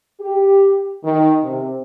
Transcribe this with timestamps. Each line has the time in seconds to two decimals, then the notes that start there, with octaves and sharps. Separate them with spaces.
0.20 G4
1.04 D#3
1.42 C3